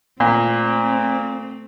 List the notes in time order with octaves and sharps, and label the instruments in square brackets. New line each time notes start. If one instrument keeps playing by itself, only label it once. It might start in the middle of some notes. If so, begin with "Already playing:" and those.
[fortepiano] A#2 [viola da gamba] A3 C4